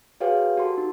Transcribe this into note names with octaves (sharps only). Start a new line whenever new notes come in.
F#4 G#4 B4 C#5 F5 G5
F#4 G4 A4 C6
D#4